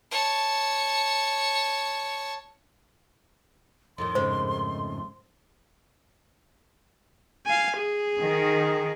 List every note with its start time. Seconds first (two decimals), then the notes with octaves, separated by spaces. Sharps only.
0.11 C#5 A5
3.98 F2 A2 D#3 C6
4.15 G#2 C#3 C5
7.47 F5 G#5
7.77 G#4
8.19 D#3